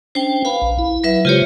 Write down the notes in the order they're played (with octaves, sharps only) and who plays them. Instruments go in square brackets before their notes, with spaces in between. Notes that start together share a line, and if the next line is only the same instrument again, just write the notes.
[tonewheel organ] C#4 D4 [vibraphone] C5 G5
[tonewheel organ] B4 [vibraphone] F5 B5
[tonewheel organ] A#1
E4
[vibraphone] F#3 B4 E5
[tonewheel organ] C#3 G#3 C5 [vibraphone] F4 G4 C#5